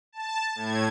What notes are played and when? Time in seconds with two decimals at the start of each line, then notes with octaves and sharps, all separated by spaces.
0.12 A5
0.55 A2 G#6